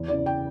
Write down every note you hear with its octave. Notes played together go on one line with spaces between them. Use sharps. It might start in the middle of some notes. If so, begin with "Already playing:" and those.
Already playing: E2
C#3 E3 D5
G5